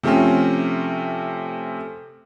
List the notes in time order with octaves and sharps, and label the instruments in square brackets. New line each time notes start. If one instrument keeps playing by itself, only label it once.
[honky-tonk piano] C3 F3 A3 C4 C#4